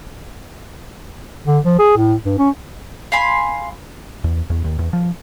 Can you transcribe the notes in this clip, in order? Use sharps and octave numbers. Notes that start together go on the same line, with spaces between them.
D3
F3
G#4
A2
G2
C#4
F5 G#5 B5 C6
E2
E2
D#2
E2
F3